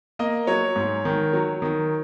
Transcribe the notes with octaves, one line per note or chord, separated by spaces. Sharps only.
A#3 D#5
F#3 C#5
G#2
D#3
F#3
D#3